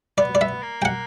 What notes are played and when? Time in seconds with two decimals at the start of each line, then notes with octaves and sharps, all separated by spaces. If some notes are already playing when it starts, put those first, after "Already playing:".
0.18 B3 D5
0.35 D5
0.41 E5
0.63 A#3
0.82 G5
0.85 F#5